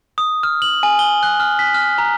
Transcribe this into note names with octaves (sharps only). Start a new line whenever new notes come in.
D#6
F6
F#7
G#5
G7
F#6
F6
B6
F6
A#5